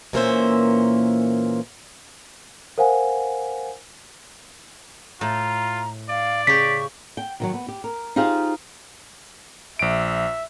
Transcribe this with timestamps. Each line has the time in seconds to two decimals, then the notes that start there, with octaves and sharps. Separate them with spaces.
0.13 A#2 E3 A#3 C#4 C5 E5
2.78 A#4 C5 F5 F#5 G#5
5.21 A2 F4 A#5
6.09 D5 F5
6.47 C#3 G4 C#6 B6
7.17 G5
7.40 D#3 E3 F#3
7.54 B3
7.68 G4
7.84 A#4
8.16 D#4 F4 G4 G#4 C5 F5
9.79 A#1 E5 D7